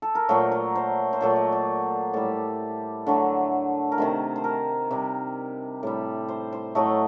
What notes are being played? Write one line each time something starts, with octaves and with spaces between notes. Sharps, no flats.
A4
A#4
A#2 F#3 A3 C5
A#4
C5
C5
A#2 F#3 A3 D5
D#5
D5
A2 G3 D5
D3 F#3 A3
A#4
C3 D#3 A3 C5
C5
A#4
C3 G3
A2 G3
C5
C5
A2 F#3 A3 D#5